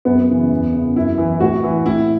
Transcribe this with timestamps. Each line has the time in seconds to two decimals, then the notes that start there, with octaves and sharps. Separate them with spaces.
0.05 F#2 B3
0.28 C#3 E3
0.51 E2
0.73 C#3 E3
0.96 F#2 E4
1.18 E3
1.40 A2 F#4
1.63 E3
1.86 A2 E4